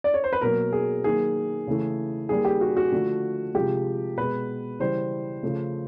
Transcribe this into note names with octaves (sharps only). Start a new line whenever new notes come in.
D5
C#5
C5
B4
B2 F#3 A#3 A#4
G#4
D#3 F#3 A#3 G#4
C#3 E3 A3
D#3 G3 A#3 G#4
G4
F#4
F#4
D3 F3 A3
C3 F3 G#3 G4
B2 G#3 B4
C#3 E3 G3 C5
C#3 F3 A3